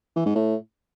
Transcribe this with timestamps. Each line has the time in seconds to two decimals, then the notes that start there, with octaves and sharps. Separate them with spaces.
0.16 E3
0.26 G#2
0.35 A2